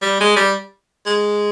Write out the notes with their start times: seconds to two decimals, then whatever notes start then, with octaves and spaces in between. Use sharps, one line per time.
0.02 G3
0.20 G#3
0.36 G3
1.06 G#3